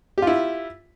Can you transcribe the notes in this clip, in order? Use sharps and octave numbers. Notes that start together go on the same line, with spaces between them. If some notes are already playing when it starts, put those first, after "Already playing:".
E4 F4 G4